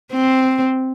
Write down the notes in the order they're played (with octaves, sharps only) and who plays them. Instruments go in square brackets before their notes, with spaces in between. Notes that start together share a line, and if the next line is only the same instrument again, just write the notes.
[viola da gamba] C4